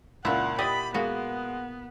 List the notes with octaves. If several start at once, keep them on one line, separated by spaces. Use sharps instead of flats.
C#2 A#2 E4 F#5
E4 G4 D5 D#5 B5 D#6
G#3 A#3 B3 F#4